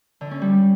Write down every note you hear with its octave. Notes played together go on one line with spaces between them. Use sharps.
D3
C#4
G3